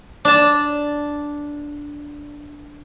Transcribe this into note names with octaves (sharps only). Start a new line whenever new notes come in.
D4 A5